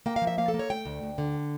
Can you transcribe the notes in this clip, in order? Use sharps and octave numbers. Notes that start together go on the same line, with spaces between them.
A#3 G5
F5
F3
E5
A#3 F5
A4
A#3
C#5
A3 G5
D2
D2
D3